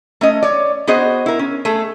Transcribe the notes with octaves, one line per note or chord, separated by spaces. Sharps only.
A3 C#4 D#5
C#5 D5
B3 F#4 G#4 C5 D#5
E4 A#4
C#4
A3 G#4 A4